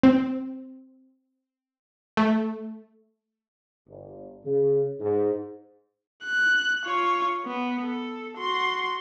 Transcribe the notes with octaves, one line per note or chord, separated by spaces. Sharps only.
C4
A3
G1
C#3
G#2
F#6
F4 C#5
B3
A4
F#4 C6